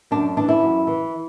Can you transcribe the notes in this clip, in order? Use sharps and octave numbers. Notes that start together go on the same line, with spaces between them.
F#2 D4
E3 D4
E4
F#2
E3